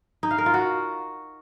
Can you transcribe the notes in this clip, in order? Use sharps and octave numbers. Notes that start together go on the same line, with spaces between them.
D#4
F5
A#4
F4
F#4